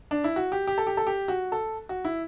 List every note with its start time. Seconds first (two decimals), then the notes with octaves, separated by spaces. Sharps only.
0.11 D4
0.24 E4
0.36 F#4
0.52 G4
0.67 G4
0.78 A4
0.87 G4
0.97 A4
1.07 G4
1.28 F#4
1.52 A4
1.89 F#4
2.05 E4